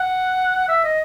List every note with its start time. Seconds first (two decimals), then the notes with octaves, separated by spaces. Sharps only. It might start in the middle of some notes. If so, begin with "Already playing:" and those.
Already playing: F#5
0.68 E5
0.84 D#5